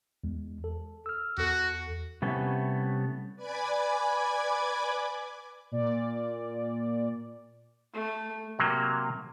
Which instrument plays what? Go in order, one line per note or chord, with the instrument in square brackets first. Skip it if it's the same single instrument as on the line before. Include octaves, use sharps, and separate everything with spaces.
[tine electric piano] E2 G#3
A4
E6 F6
[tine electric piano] E2 A4 [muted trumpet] F#4
[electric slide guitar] C3 G3 A3 B3 C#4 E4
[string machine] B4 D5 G#5 B5 D6 G#6
[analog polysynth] A#2 D5
[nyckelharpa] A3
[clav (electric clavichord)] C3 F#3 A#3